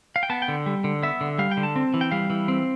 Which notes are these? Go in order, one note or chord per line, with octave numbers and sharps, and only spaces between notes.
F5
G5
B3 A5
G5
D3
G3
D3
B3 E5
D3
G3 F5
G5
D3
A5
C4
E3
G5
G3 F5
E3
C4